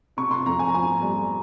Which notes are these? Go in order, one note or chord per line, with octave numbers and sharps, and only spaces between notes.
C3 C#6
C6
F2 A#5
G#5
A#5
F2 G#5
G3